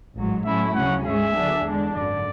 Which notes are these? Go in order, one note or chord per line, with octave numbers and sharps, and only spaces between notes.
A1 G#2 F#3
A2 F#3 A3 C#4 E4 E5
D2 C#3 F#3 C#4 F#5
G#2 G#3 C#4 G#4 E5
D3 F#3 B3 D4 G#4
E2 D3 G#3 D4
G#1 F#2 D3 D5